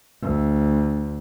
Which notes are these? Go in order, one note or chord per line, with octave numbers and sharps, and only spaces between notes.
D2